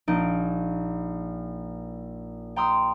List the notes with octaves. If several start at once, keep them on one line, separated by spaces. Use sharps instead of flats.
A#1 D#4 D7
G5 A#5 C6 D#6 E6